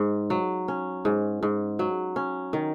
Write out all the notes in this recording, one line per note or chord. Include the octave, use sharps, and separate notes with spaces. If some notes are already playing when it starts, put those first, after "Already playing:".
Already playing: G#2
F#3
C#4
G#2
G#2
F#3
C#4
D#3